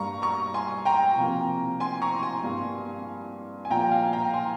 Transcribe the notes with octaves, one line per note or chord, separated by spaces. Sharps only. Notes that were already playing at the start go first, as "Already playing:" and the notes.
Already playing: G2 G3 A#3 A#5 C#6
A#5 C#6
G#5 C6
G5 A#5
C3 F3 A#3
G#5 C6
A#5 C#6
G#5 C6
G2 G3 A#3
G#5
A#2 F3 A#3 G5 A#5
F5 G#5
G5 A#5
G#5 C6